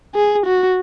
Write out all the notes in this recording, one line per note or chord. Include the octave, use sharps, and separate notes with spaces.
G#4
F#4